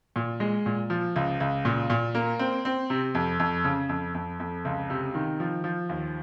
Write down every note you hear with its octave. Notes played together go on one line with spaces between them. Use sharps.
A#2
G#3
A#2
F3
C#2
C#2
A#2
A#2
A#3
C4
C4
C3
F2
F2
C#3
F2
F2
F2
C#2
C3
D#3
F3
F3
D#2